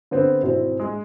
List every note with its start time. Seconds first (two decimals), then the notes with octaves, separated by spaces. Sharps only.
0.11 D3 B3 C4
0.43 G#1 B2 C4 E4
0.80 G#3